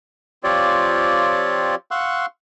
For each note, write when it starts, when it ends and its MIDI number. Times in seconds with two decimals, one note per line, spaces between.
0.44 1.75 53
0.44 1.75 60
0.44 1.75 65
0.44 1.75 67
0.44 1.75 73
0.44 1.75 74
1.91 2.26 77
1.91 2.26 78
1.91 2.26 84
1.91 2.26 85
1.91 2.26 88
1.91 2.26 90